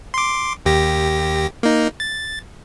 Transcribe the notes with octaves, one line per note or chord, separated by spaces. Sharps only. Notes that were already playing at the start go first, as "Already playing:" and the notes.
C6 D6
D#2 G4 A#6
A#3 D#4
A6